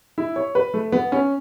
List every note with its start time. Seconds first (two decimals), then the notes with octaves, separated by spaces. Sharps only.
0.18 E4
0.36 C#5
0.55 B4
0.74 A3
0.92 B3
1.12 C#4